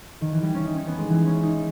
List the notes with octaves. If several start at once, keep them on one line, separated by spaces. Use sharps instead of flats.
D#3
E3
G3
C#4
D#4
C#4
B3
G#3
E3
C#4
D#4